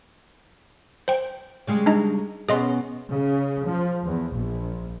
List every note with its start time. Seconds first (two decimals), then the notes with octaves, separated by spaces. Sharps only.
1.08 C5 G5
1.67 C#3 G3 G#3
1.86 D4 D#4 D#5
2.49 B2 B3 C#4 G#4 D#5 C6
3.10 C#3
3.66 F3
4.03 E2
4.32 A#1